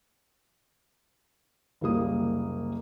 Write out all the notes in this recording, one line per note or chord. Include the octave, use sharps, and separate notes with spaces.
F#1 C2 G3 A#3 D#6